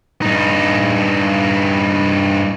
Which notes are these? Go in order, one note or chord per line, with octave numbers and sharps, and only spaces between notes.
G2 D#4